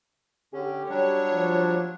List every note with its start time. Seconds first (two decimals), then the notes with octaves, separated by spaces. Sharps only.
0.53 D3 C#4 G4
0.90 F#3 G3 D4 C#5
1.32 F3